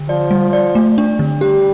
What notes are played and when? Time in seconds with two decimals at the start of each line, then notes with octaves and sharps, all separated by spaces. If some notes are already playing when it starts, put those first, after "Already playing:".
Already playing: D3
0.09 F3 D5
0.31 G3
0.53 D5
0.75 A3
0.98 D4
1.19 D3
1.41 G3 G4